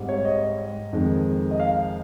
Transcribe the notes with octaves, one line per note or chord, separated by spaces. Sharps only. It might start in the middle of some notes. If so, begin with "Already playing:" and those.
Already playing: G#2 G3 C4
C#5
D#5
F2 D#3 G#3
D#5
F5